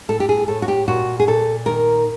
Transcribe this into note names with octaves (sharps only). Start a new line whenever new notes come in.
A2 A4
G4
G#4
A2 A4
F#4
G4
A#2 F#4
G#4
A#2 A4
D#3 A#4